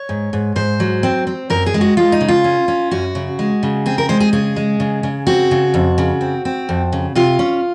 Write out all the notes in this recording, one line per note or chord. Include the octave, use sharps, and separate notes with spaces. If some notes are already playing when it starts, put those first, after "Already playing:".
Already playing: C#5
G#2
G#2
G#2 C5
F#3
C4
C4
F#2 A#4
G#4
G#3
F#4
G#3 F4
D#4
C#3
F4
C#4
C#4
F#2 F#4
C#3
G#3
C#3
C4 G#4
A#4
G#3 C5
G#4
C#3 G#4
G#3
C#3
C#3
C4 F#4
C#3
F2
C#3
C4
C4
F2
C#3
C3 F4
C#4